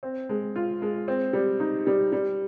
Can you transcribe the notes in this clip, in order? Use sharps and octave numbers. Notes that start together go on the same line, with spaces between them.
C4
G#3
F4
G#3
C4
G3
D#4
G3
G3